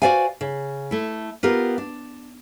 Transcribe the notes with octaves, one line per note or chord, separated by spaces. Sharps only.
F#4 G#4 C5 D5 F5 G#5
C#3
A3 E4
B3 F4 G4 A#4
D4